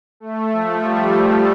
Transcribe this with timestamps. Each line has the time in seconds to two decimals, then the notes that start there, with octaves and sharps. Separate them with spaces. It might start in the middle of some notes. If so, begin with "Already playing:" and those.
0.20 A3
0.52 F3
0.83 G3
1.15 G3